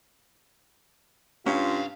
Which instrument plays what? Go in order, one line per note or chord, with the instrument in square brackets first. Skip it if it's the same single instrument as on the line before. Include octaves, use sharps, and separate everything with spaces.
[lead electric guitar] C2 F5 [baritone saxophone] G2 [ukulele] C#4 [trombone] F4